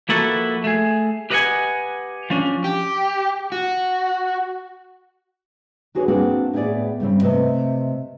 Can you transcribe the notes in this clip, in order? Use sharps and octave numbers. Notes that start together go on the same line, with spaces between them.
F3 A#3 E4 F#4 A4 B4
A3 G#4
G4 B4 D#5 F5 F#5 G#5
F3 C#4 D4
G4
F#4
D4 F#4 G#4 B4 C#5
A#3 C4 D4 F#4 G#4 B4
A2 B3 G#4 D5
G2 C#3 C4
C3 A3 B4 D#5